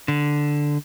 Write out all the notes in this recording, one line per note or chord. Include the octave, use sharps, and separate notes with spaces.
D3